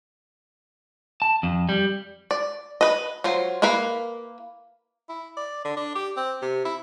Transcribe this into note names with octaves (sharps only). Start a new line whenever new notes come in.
A5
F2
G3
D5
B4 D#5
F#3 F4 C5
A#3 E4 A#4 B4 F5
E4
D5
D3
D4
G4
C4
C3
E4